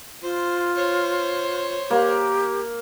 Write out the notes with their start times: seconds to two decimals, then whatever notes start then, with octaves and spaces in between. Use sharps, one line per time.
0.23 F4 C5
0.76 C5 C#5
1.90 A#3 G4